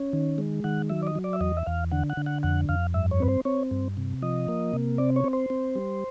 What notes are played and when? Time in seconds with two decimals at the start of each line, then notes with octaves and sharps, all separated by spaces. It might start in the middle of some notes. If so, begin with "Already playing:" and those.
Already playing: C#4
0.13 D#3
0.38 G#3
0.64 D#3 F#5
0.90 F#3 E5
1.03 D5
1.07 D#5
1.15 F#3
1.24 D5
1.33 E5
1.40 E2 D#5
1.57 E5
1.66 E2 F5
1.91 D3 F#5
2.10 F#5
2.17 D3
2.26 F#5
2.43 F2 F#5
2.69 F2 F5
2.94 G2 E5
3.11 C#5
3.20 C4 B4
3.28 C5
3.45 C4 C#5
3.71 G2
3.97 C3
4.22 F3 D#5
4.48 A#3
4.74 C3
4.98 C4 D5
5.16 C#5
5.24 C4
5.33 C5
5.50 C4
5.75 G3